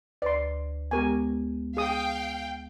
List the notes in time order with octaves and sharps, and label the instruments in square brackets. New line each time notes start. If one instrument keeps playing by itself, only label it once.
[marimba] D2 B4 [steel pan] D5 C6
[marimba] G#3 B3 [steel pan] G4 A#4 G#5
[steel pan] G#4 D#6 [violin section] F5 G5